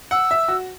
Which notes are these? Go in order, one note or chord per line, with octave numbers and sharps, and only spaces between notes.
F#5 E6
E5
F#4